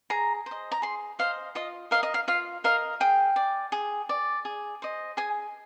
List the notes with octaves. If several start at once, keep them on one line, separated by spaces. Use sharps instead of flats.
G#4 A#5
C5 D#5
A#5
G#4 C6
C5 D#5 F5
F4 D#5
A#4 D#5 F5
D#5
F5
F4 F5
A#4 D#5 F5
G#4 G5
D5
G#4
D5
G#4
C5 D#5
G#4 G#5